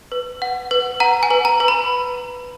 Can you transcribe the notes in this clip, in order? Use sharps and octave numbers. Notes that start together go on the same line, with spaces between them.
B4
F#5
B4
F#5 A#5
G#5
B4
A#5
B4
B5